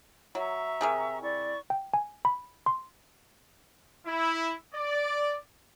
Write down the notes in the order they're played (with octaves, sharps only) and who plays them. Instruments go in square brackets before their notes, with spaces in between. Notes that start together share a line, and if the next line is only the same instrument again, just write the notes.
[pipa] F#3 [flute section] E5 A#5 C#6
[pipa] C3 G#4 A#4
[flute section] E4 D5 C#6
[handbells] G5
G#5
B5
C6
[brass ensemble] E4
D5